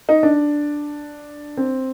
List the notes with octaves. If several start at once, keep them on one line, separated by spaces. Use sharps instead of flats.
D#4
D4
C4